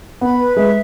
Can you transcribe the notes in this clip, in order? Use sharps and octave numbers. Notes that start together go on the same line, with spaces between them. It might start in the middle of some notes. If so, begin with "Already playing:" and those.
B3 B5
B4
G#3 E5